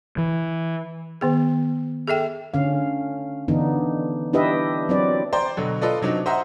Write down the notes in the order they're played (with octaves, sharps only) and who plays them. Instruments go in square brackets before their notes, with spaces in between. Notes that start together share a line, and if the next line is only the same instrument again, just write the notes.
[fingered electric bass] E3
[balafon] D#3 B3 G#4
G#4 A4 E5 G5
[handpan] D3 C#4 F5
D3 E3 B3 D4 D#4
D4 E4 G4 B4 D#5 E5
F#3 C4 E4 B4 D5
[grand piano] C5 D5 G5 A#5
B2 D3 F#3
F4 A4 B4 D5 D#5
C3 F#3 D4 D#4
C5 D#5 E5 F#5 A#5 C6